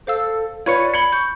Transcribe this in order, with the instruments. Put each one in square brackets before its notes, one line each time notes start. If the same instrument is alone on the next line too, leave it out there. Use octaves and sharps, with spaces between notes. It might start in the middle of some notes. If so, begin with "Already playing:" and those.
[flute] A4 [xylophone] C5 F5 E6
[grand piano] F4 B4 C#5 [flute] D5 [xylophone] G#6 C#7
[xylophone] B5 G#6 [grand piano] C#7 G7
[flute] C#6 [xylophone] G6